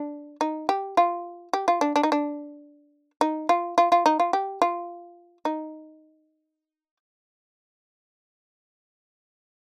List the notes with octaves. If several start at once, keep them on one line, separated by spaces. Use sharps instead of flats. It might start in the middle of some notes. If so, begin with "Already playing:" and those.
Already playing: D4
D#4
G4
F4
G4
F4
D4
D4
D#4
D4
D#4
F4
F4
F4
D#4
F4
G4
F4
D#4